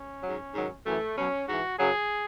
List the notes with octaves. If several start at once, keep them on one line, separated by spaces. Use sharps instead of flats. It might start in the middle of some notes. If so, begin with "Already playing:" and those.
Already playing: C#4
G#2 F#3
G#2 D#3 F#3
F#2 E3 A3
B2 F#3 C#4
G#2 E3 F#4
F#2 C#3 F#3 G#4